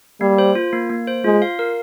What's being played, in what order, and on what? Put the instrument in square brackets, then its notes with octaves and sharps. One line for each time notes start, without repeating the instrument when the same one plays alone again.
[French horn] G3 [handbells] A#3
[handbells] C5
F4
A#3
A#3
C5
[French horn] G#3 [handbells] F4
[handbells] F5
A#4